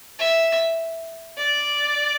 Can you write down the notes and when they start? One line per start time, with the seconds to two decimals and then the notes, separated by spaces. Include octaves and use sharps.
0.19 E5
1.38 D5